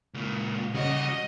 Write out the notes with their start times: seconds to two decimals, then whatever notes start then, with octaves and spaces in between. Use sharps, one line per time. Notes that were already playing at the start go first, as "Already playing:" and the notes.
0.14 C#2 A#2
0.74 C#3 G3 F#4 D#5